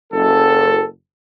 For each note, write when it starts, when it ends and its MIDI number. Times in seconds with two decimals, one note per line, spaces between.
0.13 0.85 30
0.13 0.85 69